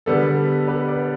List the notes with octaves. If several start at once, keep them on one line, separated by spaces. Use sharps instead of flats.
D3 G3 B3 A4
G4 B4
B4 D5